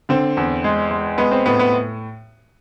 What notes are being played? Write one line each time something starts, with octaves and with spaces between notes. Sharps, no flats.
D3 C4
E2
G#3
G#3
G#3 B3
C4
A2 B3
B3